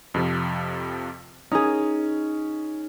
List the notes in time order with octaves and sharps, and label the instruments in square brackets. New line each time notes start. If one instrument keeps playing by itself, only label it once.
[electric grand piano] F2 C3 F3
[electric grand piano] C#4 [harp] D#4 G#4